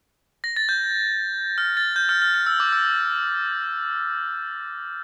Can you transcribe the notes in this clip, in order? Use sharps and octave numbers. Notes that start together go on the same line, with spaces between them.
A#6
A6
G6
F6
A6
G6
F6
F6
F6
E6
D6
E6